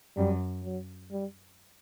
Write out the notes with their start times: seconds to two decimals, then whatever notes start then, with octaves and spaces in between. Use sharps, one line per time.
0.17 F#2 G3
0.64 F#3
1.11 G3